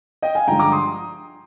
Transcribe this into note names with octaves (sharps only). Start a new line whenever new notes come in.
D#5 G5
F5 G#5
G2 D3 F3 G#3 G5 A#5
A#5 D6
C6 D#6